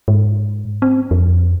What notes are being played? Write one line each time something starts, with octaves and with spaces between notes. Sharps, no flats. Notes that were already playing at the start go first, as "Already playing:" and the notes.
G#2
C4
F2